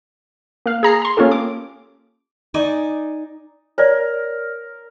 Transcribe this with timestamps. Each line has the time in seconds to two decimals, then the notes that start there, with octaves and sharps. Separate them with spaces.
0.66 A#3 F5
0.83 G#4 A#5 C7
1.02 A#5 C6
1.17 A#3 C#4 F4 G4 A4
1.31 D6
2.54 D#4 D5 D#5 G#5
3.78 A#4 C#5 D5